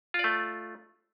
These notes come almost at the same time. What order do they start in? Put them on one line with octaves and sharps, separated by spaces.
F4 D5 A3